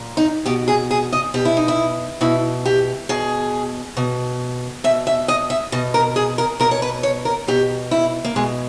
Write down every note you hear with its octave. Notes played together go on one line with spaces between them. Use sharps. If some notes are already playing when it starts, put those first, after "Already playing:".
Already playing: A#2
D#4
B2 G4
G#4
G#4
D#5
B2 G4
E4
D#4
E4
B2 E4
G4
B2 G#4
B2
B2 E5
E5
D#5
E5
B2 D#5
A#4
G#4
A#4
B2 A#4
C#5
B4
C#5
A#4
B2 G4
E4
A#3
B2 G#3